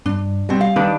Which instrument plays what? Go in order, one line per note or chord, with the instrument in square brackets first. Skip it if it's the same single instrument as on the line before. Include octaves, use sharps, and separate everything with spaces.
[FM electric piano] G2 [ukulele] D4
[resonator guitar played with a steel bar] B2 C4 [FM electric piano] G3
[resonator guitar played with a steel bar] F5
[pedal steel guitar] D#3 D4 [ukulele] D#4 G4 B4